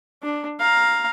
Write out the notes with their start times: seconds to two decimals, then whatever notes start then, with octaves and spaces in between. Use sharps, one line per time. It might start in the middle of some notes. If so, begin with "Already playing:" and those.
0.23 D4
0.60 F5 A#5